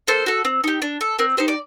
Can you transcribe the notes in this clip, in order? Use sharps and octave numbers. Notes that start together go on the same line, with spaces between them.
A#3 A4 C5
F#4 A4
C4
D#4 G4
D4
A4
C4 A#4
D#4 G4 C5
D5